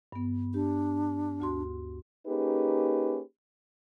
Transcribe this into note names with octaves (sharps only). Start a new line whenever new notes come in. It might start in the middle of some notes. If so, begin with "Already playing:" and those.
G2 B3
D4 G4
D2 F#4 C6
A#3 C#4 D#4 G4 G#4 B4